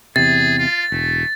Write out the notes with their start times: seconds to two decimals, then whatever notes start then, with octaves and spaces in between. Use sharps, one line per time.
0.16 E2 C3 G#4 A6
0.59 F4
0.92 E1 A3